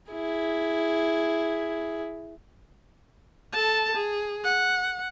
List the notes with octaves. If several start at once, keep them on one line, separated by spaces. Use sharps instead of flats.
E4 G#4
A4 A5
G#4
F#5